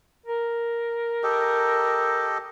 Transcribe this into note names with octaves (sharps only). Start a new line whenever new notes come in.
A#4
G4 A4 D#5